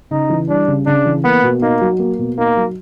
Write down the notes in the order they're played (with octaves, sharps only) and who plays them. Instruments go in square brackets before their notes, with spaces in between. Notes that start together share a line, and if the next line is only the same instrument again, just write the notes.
[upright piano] C#3 [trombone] D#4
[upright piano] E3
[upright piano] G3 [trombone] D4
[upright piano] C#3
[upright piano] C#3 [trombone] D4
[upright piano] E3
[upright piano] A#3 [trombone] B3
[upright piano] B2
[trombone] A#3 [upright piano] D#4
[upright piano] F#3
A#3
B2
[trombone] A#3 [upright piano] D#4
[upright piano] F#3